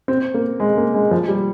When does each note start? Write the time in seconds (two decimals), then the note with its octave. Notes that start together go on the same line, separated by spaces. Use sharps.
0.08 C4
0.34 A#3
0.60 G#3
0.77 A#3
0.94 G#3
1.11 F3
1.28 G3